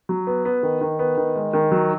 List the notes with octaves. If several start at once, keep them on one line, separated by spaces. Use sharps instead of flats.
F#3
B3
B3
D#3
D#3
B3
D#3
G#3
D#3
F#3